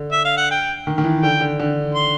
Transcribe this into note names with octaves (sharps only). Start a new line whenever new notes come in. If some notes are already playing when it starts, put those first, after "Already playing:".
Already playing: D3
E5
F5
F#5
G5
D#3
D#3
E3
D3 G5
D3
D3
C6